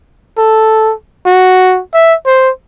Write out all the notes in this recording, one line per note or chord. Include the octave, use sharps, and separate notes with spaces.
A4
F#4
E5
C5